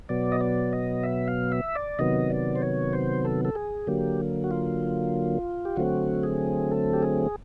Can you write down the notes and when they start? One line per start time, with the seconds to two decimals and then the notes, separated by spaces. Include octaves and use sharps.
0.09 B2 F#3 B3 D5
0.32 D#5
0.41 D5
0.73 D#5
1.03 E5
1.28 F5
1.52 E5
1.75 D5
1.99 C3 D#3 F#3 B3 D#5
2.30 D5
2.55 C5
2.62 C#5
2.93 C5
3.25 A4
3.45 A4
3.55 G#4
3.87 D3 F#3 A#3 G4
4.44 F#4
4.51 F4
5.65 G4
5.76 D3 F#3 A3 C4 F#4
6.23 G#4
6.71 A4
6.93 G4
7.03 G#4